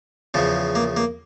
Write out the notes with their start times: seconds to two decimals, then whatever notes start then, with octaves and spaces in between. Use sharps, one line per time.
0.34 E2 C#3 F3
0.75 A#3
0.97 A#3